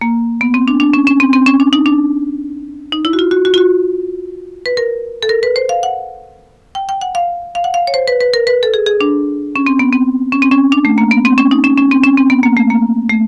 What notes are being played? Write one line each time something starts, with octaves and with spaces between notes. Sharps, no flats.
A#3
B3
C4
D4
D4
C#4
C#4
C4
C4
C#4
D4
D#4
D4
D#4
E4
F#4
F4
F#4
F#4
F4
F#4
B4
A#4
A4
A#4
B4
C5
F5
F#5
G5
G5
F#5
F5
F5
F#5
F5
C#5
C5
B4
B4
A#4
B4
A4
G#4
G#4
D4
C#4
C4
B3
C4
C#4
C4
C#4
D4
A3
A#3
B3
C4
C#4
D#4
C#4
C#4
C4
C#4
C4
B3
A#3
A3
A#3
A3